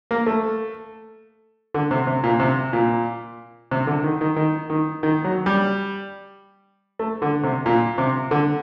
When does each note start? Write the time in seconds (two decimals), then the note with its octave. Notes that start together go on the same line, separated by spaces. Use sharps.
0.11 A#3
0.26 A3
1.74 D3
1.91 C3
2.07 C3
2.24 A#2
2.40 C3
2.73 A#2
3.71 C3
3.87 D3
4.04 D#3
4.21 D#3
4.36 D#3
4.70 D#3
5.03 D#3
5.24 F#3
5.46 G3
6.99 A3
7.22 D3
7.44 C3
7.66 A#2
7.98 C3
8.31 D3